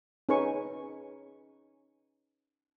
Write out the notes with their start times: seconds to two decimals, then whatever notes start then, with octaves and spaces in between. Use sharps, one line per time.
0.29 C#4 D#4 G#4 B4 G#5 C#6